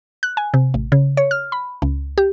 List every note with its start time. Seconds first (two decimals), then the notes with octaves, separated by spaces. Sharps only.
0.23 F#6
0.37 G#5
0.54 C3
0.74 A1
0.92 C#3
1.17 C#5
1.31 F6
1.52 B5
1.82 C#2
2.18 G4